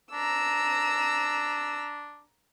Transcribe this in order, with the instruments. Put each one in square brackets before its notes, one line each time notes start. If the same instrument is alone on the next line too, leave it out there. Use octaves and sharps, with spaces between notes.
[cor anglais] D4 [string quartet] A#5 E6